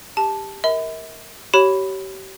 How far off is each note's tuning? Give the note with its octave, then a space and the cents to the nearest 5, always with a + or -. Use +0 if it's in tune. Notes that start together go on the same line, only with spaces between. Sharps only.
G4 +10 A5 -5
A#4 +0 E5 -45 B5 +30
G4 -35 C#5 +0 B5 +0